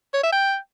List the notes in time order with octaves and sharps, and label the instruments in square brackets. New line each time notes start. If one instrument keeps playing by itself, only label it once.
[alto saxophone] C#5
E5
G5